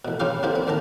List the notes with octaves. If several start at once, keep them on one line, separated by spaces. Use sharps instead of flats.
A1 B2
G2 C#3 G3 F4 F5 D6
D3 A#3 C4 E4 G4
C4
A1 D#2 D#3 A5 A#5